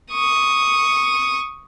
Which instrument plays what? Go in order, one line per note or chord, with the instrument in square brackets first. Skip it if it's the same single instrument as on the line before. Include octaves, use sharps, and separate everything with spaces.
[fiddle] C#6 D#6